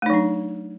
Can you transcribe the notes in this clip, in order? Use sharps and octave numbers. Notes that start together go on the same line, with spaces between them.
F#3 A3 D4 D#4